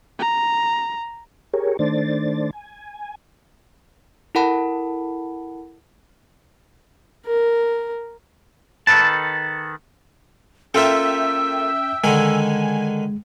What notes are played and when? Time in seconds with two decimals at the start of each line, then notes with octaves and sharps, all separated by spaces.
0.19 A#5
1.53 G4 G#4 A#4 C#5
1.79 D#3 A3 D4 C5 D5 A6
2.53 G#5
4.35 E4 A4 A#4 F#5 A5 B5
7.26 A#4
8.87 D#3 A4 B4 A5
10.74 A#3 C#4 F4 A4 E5 G5 E6
12.04 D3 D#3 G#3 G#5